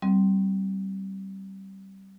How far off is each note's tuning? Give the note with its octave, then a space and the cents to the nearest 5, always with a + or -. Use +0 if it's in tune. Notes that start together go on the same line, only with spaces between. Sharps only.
G3 -20 C4 +0